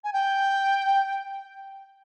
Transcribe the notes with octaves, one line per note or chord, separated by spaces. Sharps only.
G#5
G5